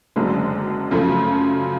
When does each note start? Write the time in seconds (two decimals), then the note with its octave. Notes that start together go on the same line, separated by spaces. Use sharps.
0.16 F#1 F#2 D3 G#3 D4
0.91 F#2 C#3 F3 A3